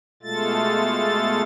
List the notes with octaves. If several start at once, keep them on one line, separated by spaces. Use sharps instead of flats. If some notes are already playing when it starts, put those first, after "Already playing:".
B2 G#3 A3 F4 A4 A6